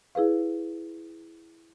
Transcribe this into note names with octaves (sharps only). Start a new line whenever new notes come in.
E4 G#4 B4 F5